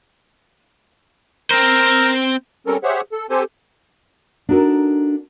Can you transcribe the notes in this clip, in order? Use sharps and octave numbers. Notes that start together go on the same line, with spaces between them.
C4 A#4 C5
G3 C4 C#4 A4 A#4
G4 G#4 C5 C#5 E5 F#5
A4
C4 G4 A4 C5 G#5
D4 D#4 F#4 A4 A#4